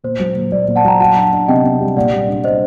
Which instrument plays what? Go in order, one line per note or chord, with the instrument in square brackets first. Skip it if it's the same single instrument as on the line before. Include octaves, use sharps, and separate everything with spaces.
[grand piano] A#2 [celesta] C5
[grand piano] F#3
A#2
[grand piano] F#3 [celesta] D5
[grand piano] A#2
[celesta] F#5 A5
[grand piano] F#3 [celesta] G5 A#5
[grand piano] F#4 [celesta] F#5 A5
[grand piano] D4
D4
[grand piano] C3 [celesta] D#5 G5
[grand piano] C3
G3
[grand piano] A#2 [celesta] D5 F#5
[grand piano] G3
D4
[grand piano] D4 [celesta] C5 D#5